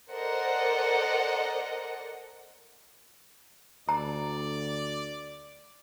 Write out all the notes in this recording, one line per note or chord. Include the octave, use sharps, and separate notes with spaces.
A4 A#4 C5 D5 D#5 F#5
D2 D5 A#5